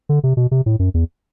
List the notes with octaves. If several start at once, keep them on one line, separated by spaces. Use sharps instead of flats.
D3
C3
B2
C3
A2
F#2
E2